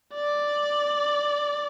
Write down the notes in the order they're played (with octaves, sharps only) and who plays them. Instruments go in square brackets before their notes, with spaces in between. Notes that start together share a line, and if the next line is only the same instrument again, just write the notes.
[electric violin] D5